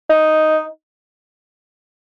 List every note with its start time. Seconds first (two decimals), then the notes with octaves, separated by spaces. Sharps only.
0.10 D#4